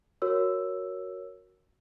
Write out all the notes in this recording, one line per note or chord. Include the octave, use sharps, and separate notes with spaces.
F#4 A#4 C#5 E6